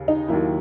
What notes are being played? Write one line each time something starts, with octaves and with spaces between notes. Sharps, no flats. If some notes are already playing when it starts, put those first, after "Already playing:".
Already playing: D#2 C#3
D#4
D#2 D#3 F#3 A#3 E4